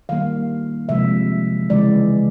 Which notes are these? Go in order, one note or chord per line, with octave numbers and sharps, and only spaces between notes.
D#3 G3 A#3 F5
C3 F3 G#3 E5
C#3 E3 G#3 D5